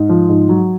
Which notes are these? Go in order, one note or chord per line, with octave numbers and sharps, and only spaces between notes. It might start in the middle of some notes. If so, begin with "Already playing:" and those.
Already playing: G#2
F3
G#2
F#3